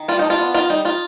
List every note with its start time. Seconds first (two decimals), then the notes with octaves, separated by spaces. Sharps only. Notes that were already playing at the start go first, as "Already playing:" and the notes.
Already playing: D#3
0.08 G3 F4
0.19 D4 D#4
0.30 F4
0.39 B3
0.54 D#3 F4
0.69 G3 D#4
0.85 D#4 F4